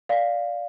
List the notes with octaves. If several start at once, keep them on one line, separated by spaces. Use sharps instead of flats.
D5 F5